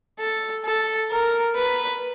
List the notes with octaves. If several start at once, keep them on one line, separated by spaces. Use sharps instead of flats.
A4
A4
A#4
B4